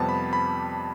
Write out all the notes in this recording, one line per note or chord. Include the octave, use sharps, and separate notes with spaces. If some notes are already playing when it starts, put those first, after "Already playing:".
Already playing: F2 C3 G3 B3 A5
B5
B5